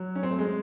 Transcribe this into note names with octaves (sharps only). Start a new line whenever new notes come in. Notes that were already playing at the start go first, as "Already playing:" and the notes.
Already playing: F#3
C#4
C4
A3
G#3